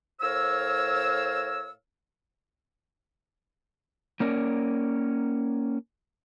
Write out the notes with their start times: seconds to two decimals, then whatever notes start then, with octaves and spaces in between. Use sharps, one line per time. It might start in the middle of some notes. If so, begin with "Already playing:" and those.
0.21 A2 A#4 C5 C#5 F5 E6
4.20 A#3 C#4 A#4 D5